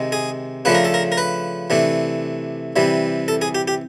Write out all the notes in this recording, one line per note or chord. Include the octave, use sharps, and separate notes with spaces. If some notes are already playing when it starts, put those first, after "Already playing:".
Already playing: C3 D#3 G#3
G#4
C#3 F3 A3 D4 B4
A#4
A4
A#4
A#4
B4
C3 E3 A3 D4
C3 E3 G3
A4
G#4
G4
G4